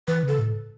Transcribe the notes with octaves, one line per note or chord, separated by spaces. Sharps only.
E3 B4
C#3 A4
A2